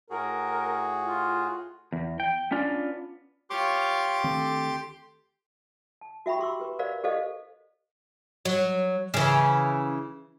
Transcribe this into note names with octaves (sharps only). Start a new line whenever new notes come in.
A2 F#4 G#4 A#4
F4
E2
G5
B3 C#4 D4 F4 D5
F4 G4 C#5 C6 D6
D2 D#3 C4 A4
A5
F#4 E5 G5 B5 C#6
G4 C6 D6 E6
G4 B4
A#4 C5 D5 F5
G4 A4 C5 D5 D#5 F5
F#3
C#3 E3